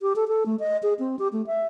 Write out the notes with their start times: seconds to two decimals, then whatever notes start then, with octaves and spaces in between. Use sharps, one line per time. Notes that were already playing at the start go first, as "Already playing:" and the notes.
0.02 G4
0.16 A4
0.28 A4
0.46 A3
0.60 D#5
0.83 G#4
0.99 C4
1.19 G4
1.33 A3
1.47 E5